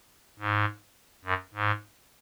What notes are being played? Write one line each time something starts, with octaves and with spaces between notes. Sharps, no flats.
G#2
F#2
G#2